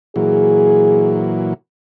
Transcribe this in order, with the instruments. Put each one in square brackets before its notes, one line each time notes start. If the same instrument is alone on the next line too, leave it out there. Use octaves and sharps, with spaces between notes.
[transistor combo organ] A#2 E3 F#3 [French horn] G#4